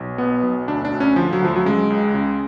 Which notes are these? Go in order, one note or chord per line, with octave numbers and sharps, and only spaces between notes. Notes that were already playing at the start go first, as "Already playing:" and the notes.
Already playing: B1
B2 B3
B1
D2 D4
D4
D2
C#4
D3 F3
F#3
D2 F3
F#3
C#3 G#3
C#2
C#3